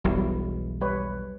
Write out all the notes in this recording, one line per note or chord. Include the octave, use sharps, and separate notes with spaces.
E1 B1 F#3 G3 E4
G3 B4 C#5